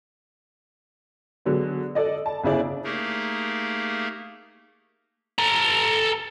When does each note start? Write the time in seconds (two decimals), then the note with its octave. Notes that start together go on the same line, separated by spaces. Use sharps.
1.46 D3 F#3 G#3 B3
1.95 A4 D5 D#5
2.26 A5
2.44 G1 C#3 D4 E4 G#4 D5
2.84 A3 A#3 D#4 G4 G#4 A#4
5.39 A4 A#5